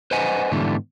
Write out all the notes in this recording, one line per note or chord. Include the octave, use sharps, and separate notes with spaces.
B4 C5 D#5 F#5 G#5
G#2 D3 E3 G3 A3 B3